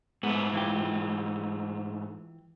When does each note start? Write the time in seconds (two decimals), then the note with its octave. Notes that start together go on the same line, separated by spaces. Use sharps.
0.23 G#2 A3 B3
0.53 E3 F4 G4